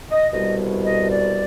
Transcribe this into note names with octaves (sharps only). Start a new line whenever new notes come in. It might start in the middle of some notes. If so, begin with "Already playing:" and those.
D#5
C2 B2 G3 D#5
D#5
D5